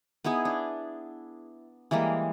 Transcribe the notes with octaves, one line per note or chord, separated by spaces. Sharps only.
B3 D#4 E4 G#4
D4
E3 G3 G#3 A#3